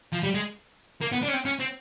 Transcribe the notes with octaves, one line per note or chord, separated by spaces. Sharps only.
F3
G3
G#3
A#3
B3
D4
C#4
C4
C#4
C4